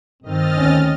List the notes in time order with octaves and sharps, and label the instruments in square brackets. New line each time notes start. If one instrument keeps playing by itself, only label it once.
[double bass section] G2 D#3 [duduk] C4 [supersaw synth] D#5 F6 A6
[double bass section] D2 [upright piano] D#3 C#4